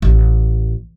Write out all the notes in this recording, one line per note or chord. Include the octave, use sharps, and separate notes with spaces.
A1